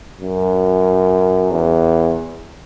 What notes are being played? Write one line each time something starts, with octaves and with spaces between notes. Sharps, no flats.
F#2
E2